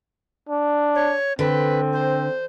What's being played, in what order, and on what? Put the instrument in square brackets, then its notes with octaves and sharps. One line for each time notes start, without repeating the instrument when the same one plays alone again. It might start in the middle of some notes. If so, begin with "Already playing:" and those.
[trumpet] D4
[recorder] C#5
[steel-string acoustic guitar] D3 [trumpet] C4 [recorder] B4
[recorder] C5